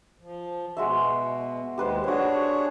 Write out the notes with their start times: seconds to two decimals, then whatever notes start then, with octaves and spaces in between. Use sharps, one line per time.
0.20 F3
0.77 B2 G#3 F#4 E5
1.78 D#2 G#3 G4 B4 C5
2.04 D4 F#4 G#4 C5 C#5